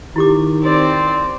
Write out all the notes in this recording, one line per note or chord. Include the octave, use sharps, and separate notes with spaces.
D#3 E4 G4 D6
C4 D5